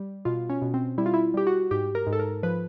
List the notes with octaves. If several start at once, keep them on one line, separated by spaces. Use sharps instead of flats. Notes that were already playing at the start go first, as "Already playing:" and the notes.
Already playing: G3
B2 F4
C#4
B2
C4
G3 E4
F4
E4
G3 G4
F#4
G#2 G4
A#4
G#2
A4
A#4
F3 B4